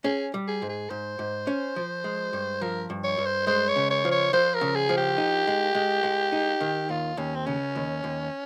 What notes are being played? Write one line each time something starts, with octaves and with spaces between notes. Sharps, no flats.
C#4 G#4
G3
G#4
G#2
G#4
G#2 C5
G#2
C#4
F3
G#3
G2
F3 A#4
G2
C#5
G2
C5
G#3 C5
C#5
C#3
C#5
F3
C#5
F3 C5
A#4
C#3
G#4
F3
G4
D#4
G#3
G#3
G#3
D#4
D#3
D#2 F4
D#2 C#4
C4
C#3 C#4
D#2
D#2